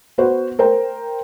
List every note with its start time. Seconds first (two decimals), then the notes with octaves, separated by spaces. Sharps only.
0.18 B3 F#4 B4 C5
0.59 A#4 C5 G5 A#5